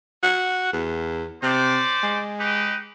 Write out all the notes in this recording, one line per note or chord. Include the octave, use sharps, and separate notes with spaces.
F#4
E2
C3 C#4 C5 D5
G#3
D#4 G4 B4